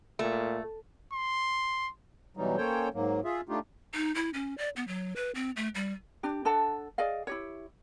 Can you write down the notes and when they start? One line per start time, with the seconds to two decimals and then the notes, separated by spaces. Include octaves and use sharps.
0.19 A#2 A3
1.13 C6
2.37 B2 E3 F#3 G3 D#4
2.57 A#3 C#4 A4 C5 C#5 G5
2.94 G#2 F#3 A#3
3.24 F4 G#4 E5
3.49 A3 D4 D#4 F4 G4
3.94 D#4
4.15 E4
4.34 C#4
4.58 D5
4.76 B3
4.88 F#3
5.16 B4
5.35 C4
5.57 A3
5.75 G3
6.23 D4 G4
6.45 D4 A4 F#5 A5
6.98 G#4 D5 D#5 F5
7.27 E4 G4 C#5